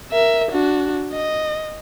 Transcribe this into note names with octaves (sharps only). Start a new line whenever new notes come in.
A#4 E5
D4 F#4
D#5